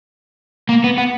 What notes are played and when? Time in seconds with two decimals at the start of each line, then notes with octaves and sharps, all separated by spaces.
0.69 A#3
0.84 B3
0.98 B3